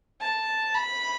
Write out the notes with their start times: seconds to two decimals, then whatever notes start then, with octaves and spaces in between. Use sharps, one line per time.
0.21 A5
0.75 B5